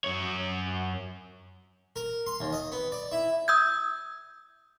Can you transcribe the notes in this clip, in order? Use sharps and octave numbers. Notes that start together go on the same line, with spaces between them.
F#2 C#5
A#4
C6
D#2
D#5
B3
D5
E4
D#6 E6 G6 G#6